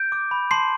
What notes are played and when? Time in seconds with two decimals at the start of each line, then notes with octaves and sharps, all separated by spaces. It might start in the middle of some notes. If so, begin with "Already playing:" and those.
Already playing: G6 D7
0.12 D6
0.31 B5
0.51 A5 C6 C7